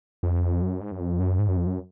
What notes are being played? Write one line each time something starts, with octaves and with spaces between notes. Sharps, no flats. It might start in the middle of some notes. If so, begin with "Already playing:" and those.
F2
F#2
G#2
F#2
F2
F#2
G#2
F#2
F2
F#2